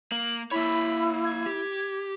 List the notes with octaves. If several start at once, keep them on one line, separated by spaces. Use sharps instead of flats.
A#3 F#7
A#3 E4 C#5 B5
G#6
G4